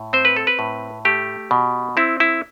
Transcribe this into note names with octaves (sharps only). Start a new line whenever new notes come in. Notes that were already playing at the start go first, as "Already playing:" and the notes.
Already playing: A2
C4 C5
B4
A4
B4
A2
A3 G4
B2
C4 E4
E4